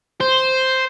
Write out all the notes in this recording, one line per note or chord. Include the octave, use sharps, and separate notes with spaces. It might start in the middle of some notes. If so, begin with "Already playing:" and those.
C5